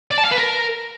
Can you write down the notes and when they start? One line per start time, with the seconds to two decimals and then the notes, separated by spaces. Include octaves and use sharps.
0.11 D5
0.18 A5
0.25 F5
0.32 B4
0.38 A#4